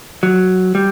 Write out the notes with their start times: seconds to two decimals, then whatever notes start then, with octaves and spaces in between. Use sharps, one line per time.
0.23 F#3
0.75 G3